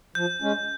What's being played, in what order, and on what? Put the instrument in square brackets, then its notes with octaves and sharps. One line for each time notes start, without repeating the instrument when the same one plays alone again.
[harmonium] F3 [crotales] G6
[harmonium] G#3 C#4